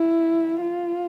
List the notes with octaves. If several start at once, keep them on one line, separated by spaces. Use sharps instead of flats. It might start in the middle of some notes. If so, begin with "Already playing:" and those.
Already playing: E4
F4